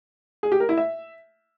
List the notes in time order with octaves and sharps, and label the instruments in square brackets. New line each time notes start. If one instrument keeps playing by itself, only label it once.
[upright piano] G#4
G4
A#4
E4
E5